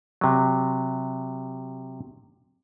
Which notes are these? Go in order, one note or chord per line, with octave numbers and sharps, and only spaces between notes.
C3 F#3